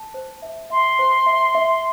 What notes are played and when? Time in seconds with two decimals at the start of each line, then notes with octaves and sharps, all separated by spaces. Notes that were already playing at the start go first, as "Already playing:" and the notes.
Already playing: A5
0.14 C5
0.42 E5
0.70 E5 C6
0.99 C5
1.26 E5
1.55 E5